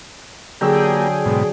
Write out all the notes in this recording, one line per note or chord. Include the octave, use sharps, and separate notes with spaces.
D3 F#3 A#3 G4 G#4 G5 E6
G#2 B2